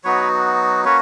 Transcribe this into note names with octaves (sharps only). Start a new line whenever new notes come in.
F#3 B3 D#4 F#4 B4 C#5
A#3 C#4 F#4 B4 C#5